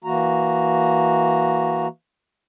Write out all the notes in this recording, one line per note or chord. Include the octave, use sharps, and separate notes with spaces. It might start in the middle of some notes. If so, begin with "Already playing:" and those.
E3 A#3 F#4 A#5